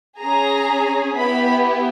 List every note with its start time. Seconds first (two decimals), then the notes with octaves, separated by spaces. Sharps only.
0.21 C#4 G#4 A#5
1.17 B3 E4 G4 B5